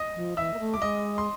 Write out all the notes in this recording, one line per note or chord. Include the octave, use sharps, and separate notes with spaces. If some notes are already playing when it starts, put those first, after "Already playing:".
Already playing: D#5 D#6
F3
E3 E5 E6
A#3
A3
D6
G3
G#3 D#5 D#6
C6